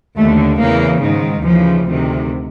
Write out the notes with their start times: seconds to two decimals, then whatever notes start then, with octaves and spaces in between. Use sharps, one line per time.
0.17 D#2 D3 A3
0.59 E2 C#3 E3 A#3
1.01 G#2 D#3
1.44 D#2 C#3 E3 F3
1.85 D2 C3 D#3